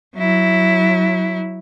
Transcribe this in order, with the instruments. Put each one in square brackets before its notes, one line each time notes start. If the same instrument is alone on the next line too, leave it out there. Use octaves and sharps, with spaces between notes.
[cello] F#3 E4